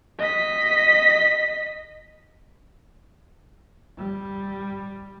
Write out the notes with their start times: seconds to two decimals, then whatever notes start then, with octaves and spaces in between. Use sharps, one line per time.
0.19 D#5 B6
3.98 G3